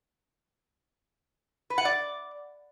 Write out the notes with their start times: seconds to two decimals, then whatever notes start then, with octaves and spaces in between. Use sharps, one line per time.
1.70 B4
1.78 F#5
1.85 D5